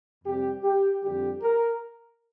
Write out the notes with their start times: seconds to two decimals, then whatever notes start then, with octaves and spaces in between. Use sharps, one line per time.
0.24 F2 C3 G3 G4
0.63 G4
1.01 F2 D3 G3 G4
1.41 A#4